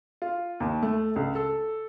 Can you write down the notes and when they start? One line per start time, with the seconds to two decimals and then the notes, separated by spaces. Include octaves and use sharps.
0.22 F4
0.60 D#2
0.82 A3
1.16 C#2
1.35 A4